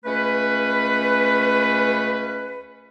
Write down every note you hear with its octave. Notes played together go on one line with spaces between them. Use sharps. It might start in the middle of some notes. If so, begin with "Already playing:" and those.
C#2 A3 C#4 B4